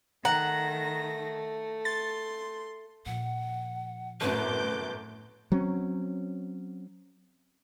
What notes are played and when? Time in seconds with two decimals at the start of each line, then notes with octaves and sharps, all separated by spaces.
0.25 D#3 A3 F#5 A#5 A#6
1.85 C6 A6
3.06 A#2 F3 F#5
4.21 G1 C2 F#2 A2 B4 D6 G6
5.52 F#3 C4 C#4